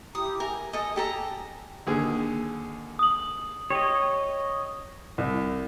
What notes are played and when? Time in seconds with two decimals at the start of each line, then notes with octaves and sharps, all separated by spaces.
0.15 E4 G4 A#5 D#6
0.40 A#4 G#5
0.73 A4 D#5
0.96 G4 A4 A#5
1.87 D#2 D3 G#4
2.99 D#6 F#7
3.70 G4 C#5 D#5
5.18 C2